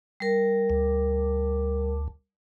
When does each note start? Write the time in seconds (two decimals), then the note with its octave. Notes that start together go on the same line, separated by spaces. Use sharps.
0.20 G3 A#4
0.70 D2